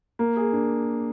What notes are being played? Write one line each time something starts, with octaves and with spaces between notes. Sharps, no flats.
A#3
G#4
D4